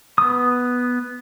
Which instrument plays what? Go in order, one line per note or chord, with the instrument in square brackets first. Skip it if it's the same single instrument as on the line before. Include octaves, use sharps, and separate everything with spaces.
[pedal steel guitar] B3 D#6